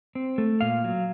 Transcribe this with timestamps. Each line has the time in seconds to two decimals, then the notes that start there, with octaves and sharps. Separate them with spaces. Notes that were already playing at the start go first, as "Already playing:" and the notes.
0.15 C4
0.38 A3
0.61 A#2 F5
0.84 F#3